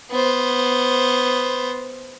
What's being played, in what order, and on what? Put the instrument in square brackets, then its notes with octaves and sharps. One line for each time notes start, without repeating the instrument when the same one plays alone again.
[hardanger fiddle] B3 C5